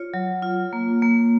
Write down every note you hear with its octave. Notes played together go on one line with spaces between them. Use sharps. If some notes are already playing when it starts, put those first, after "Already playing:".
Already playing: F4 C#5
F#3
F4
A#3
A#3